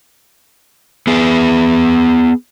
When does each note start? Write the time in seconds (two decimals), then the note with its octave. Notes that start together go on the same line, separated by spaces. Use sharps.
1.07 B3 G#4